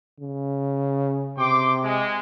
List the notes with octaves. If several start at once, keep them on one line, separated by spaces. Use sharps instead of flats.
C#3
C3 G5 C6 D6
G#3